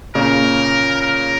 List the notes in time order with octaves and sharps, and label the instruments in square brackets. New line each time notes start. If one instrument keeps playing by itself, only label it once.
[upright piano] A#2 C#3 [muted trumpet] A#4
[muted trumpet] A#4